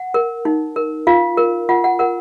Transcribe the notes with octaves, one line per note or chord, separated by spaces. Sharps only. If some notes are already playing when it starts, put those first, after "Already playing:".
Already playing: F#5
A#4
D#4
A#4
F4 F5
A#4
F4 F#5
F#5
A#4 F#5